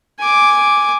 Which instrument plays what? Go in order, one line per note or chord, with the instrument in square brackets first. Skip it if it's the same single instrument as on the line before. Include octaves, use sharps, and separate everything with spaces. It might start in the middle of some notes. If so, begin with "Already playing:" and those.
[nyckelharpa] G#5 D6